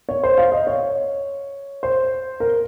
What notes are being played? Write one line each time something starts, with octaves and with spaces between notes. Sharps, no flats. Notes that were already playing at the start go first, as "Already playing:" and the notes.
C#5
C5
F5
D#5
C#5
C5
A#4